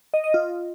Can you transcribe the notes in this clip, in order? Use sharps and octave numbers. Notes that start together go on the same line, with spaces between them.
D#5
D#5
F4